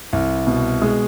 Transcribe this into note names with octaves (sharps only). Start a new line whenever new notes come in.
C2
B2
G#3